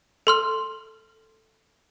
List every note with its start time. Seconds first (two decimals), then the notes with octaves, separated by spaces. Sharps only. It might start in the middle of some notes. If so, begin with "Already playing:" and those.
0.27 A4 C6 F6